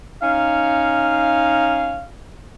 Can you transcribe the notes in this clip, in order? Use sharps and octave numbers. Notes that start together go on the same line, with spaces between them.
C#4 D#4 F5